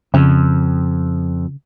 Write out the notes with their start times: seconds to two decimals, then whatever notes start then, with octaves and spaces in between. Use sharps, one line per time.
0.14 F2 C#3